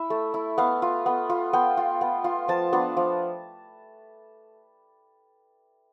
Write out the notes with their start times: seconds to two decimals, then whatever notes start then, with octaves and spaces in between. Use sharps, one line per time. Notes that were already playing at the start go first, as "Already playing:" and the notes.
Already playing: E4 E5
0.10 A3
0.34 E4
0.58 B3 F5
0.82 F4
1.06 B3
1.30 F4
1.53 B3 G5
1.77 F4
2.01 B3
2.24 F4
2.48 F3 A5
2.73 B3 D4 F4
2.97 F3